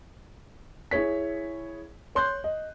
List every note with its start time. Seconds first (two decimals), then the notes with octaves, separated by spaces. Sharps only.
0.91 E4 G#4 C#5 B6
2.15 C#5 C6 F#6 G6
2.44 D#5